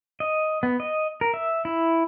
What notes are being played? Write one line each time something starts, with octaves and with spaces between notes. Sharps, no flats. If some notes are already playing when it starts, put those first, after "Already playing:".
D#5
B3
D#5
A#4
E5
E4